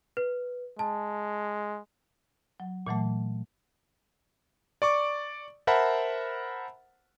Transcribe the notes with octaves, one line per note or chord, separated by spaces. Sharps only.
B4
G#3 A5
F#3
A#2 E3 F#3 A3
D5 C#6 D6
A#4 C5 E5 F#5 A5 B5